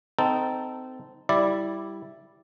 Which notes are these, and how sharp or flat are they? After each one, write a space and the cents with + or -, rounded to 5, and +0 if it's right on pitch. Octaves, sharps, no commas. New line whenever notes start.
C4 -25 D#4 +0 A4 +0
G3 -5 E4 +0 D5 +0